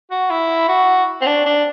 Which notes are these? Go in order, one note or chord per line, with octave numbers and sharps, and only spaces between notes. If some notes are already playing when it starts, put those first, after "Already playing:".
F#4
E4
F#4
C4
D4
D4